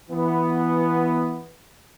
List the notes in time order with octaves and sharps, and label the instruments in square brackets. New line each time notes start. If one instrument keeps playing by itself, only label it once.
[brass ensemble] E3 B3